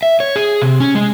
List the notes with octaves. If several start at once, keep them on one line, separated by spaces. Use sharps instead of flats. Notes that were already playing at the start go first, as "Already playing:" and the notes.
E5
C#5
G#4
C3
C#4
G#3